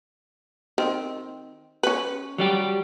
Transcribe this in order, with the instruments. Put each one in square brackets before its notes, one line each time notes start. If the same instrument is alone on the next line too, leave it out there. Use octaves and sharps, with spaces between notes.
[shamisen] D#3 C4
C#4 B4
[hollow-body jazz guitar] F#3 G3 G4